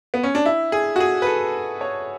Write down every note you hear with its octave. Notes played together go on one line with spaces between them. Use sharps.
B3
C#4
D4
E4
G#4
F#4
G#4
B4
A4
C#5